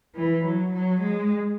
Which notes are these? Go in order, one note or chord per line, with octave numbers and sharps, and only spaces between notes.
E3
F#3
F#3
G#3